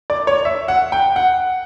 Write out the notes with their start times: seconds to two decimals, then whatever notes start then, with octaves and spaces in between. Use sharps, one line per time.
0.10 D5
0.27 C#5
0.45 E5
0.68 F#5
0.92 G5
1.16 F#5